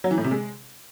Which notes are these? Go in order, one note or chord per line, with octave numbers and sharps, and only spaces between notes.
F#3
E3
A2
C3
G#3